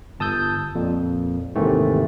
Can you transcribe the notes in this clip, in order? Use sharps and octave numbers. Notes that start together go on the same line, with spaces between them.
G1 A5 D#6 E6 G6
F2 A#2
D#2 G#2 C3 D#3 E3 A3